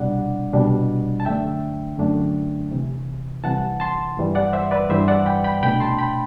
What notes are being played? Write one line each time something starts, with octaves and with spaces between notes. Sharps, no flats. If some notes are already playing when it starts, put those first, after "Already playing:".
Already playing: C2 B2 G3 D4 D5 F#5
C2 B2 G3 D4
A5
F#2 D3 A3 D4 E5 G5
F#2 D3 A3 D4
C2 C3 E3
C2 C3 E3 F#5 A5
A5 C6
G2 E3 G3
D5 F#5
C5 E5
B4 D5
G2 E3 G3 C5 E5
D5 F#5
G5 B5
G5 B5
C2 B2 A3 D4 G5 B5
A5 C6
G5 B5